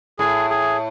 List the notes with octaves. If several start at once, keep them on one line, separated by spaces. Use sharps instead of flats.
A2 G#4
G#4